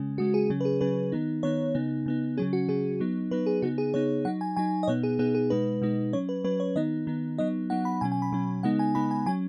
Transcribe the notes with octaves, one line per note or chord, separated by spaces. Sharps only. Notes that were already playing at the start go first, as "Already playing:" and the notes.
Already playing: C#3 G#3 C#4
C#3 G#3 C#4 F#4
G#4
C#3 F#3 C#4
B4
G#4
C#3 F#3 C#4 B4
D#3 B3 D#4
D#3 B3 D#4 C#5
C#3 B3 D#4
C#3 B3 D#4
C#3 F#3 C#4 G#4
F#4
C#3 F#3 C#4 G#4
F#3 B3 D#4
F#3 B3 D#4 B4
G#4
C#3 B3 D#4 F#4
G#4
C#3 B3 D#4 C#5
F#3 D#4 F#5
G#5
F#3 D#4 G#5
D#5
B2 B3 D#4 C#5
G#4
B2 B3 D#4 G#4
G#4
B2 G#3 D#4 B4
B2 G#3 D#4
F#3 C#4 C#5
B4
F#3 C#4 B4
C#5
D#3 B3 D#4 D#5
D#3 B3 D#4
F#3 B3 D#4 D#5
F#3 B3 D#4 F#5
B5
B2 F#3 C#4 G#5
G#5
B5
B2 F#3 C#4
C#3 G#3 B3 D#4 F#5
G#5
C#3 G#3 B3 D#4 B5
G#5
F#3 C#4 G#5